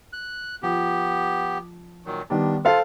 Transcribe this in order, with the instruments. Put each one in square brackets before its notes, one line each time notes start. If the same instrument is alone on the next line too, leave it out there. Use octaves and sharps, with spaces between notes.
[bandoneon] F#6
[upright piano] F3 [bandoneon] B3 G4
[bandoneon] A#2 D#3 F#3
[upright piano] D#3 G3 B3 [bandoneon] D4
[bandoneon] F4 [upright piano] A4 C5 F5